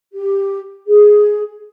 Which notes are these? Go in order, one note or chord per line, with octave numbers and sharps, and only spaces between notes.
G4
G#4